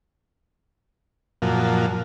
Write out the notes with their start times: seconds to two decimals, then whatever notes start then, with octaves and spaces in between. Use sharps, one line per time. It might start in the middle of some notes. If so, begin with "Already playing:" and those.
1.42 F#2 A#2 F3